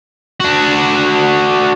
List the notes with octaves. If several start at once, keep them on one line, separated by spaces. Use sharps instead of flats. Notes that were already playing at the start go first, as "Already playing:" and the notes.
D4 F#4